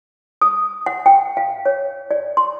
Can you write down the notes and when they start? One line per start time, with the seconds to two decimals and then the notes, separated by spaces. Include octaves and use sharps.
0.42 D#6
0.86 F#5
1.06 G5
1.37 F5
1.66 C#5
2.11 D5
2.37 C6